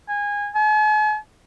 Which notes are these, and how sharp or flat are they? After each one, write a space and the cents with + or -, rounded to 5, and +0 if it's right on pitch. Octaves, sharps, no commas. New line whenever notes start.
G#5 -20
G#5 +45